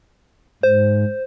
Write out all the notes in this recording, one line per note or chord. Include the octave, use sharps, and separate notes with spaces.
G#2 C5